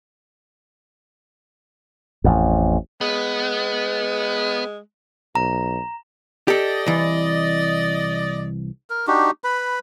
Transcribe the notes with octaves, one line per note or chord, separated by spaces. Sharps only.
A1 F2
G#3 B3
B1 A#5
G4 A4 D5 D#5
C2 E3
A#4
D4 D#4 F#4 G4
B4 B5